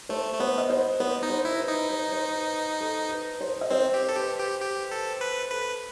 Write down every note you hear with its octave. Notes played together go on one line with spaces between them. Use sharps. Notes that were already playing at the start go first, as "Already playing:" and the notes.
A3 C5
A3
B3 C5
D#5
C5
B3 C5
D#4
C5
E4
C5
B4
D#4
C5
B4
C5
B4
A4
B4
C5
D#5
C4 C5
G4
A4
G4 B4
G4
G4
A4
B4
A4 B4